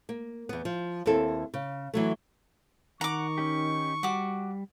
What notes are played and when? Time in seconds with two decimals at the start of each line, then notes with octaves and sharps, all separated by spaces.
0.09 A#3
0.49 E2 B3
0.65 F3
1.06 D#2 C4 E4 A4
1.54 C#3
1.94 E3 F#3 A3
3.01 D#3 F#5 A#5 C#6 D6
3.38 C#4 D#4 G4
4.03 G3 F#4 D6